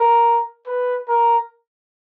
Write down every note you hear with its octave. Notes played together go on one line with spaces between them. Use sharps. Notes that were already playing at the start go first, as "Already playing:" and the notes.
Already playing: A#4
B4
A#4